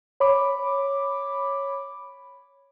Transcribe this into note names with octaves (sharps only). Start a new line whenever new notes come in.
C#5 B5 D6